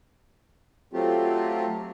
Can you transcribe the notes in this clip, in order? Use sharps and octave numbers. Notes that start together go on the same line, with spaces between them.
F#3 A3 C4 F4 G4